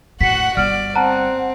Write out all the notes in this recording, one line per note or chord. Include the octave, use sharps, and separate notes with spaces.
A2 F#4 F#5 B6 C#7
G1 D5 F6
C4 F#5 A5 A#5